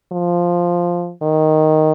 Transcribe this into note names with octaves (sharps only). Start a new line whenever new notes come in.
F3
D#3